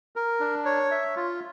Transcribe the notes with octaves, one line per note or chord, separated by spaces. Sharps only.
A#4
D4
C#5
E5
F4